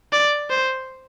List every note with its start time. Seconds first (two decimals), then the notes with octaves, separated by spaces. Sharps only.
0.12 D5
0.50 C5